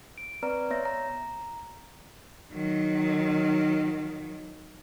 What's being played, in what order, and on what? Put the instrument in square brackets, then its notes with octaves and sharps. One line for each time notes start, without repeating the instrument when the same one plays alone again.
[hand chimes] D7
C4 B4 D5 A#5
B3 C#5 E5 A#6
A#5
[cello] D#3 F#3